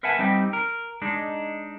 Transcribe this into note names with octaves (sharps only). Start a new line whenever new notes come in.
A#4 B4 E5 F#5 G#5 A5
G3 C4 D#4 G4
A#4
G#3 D4 D#4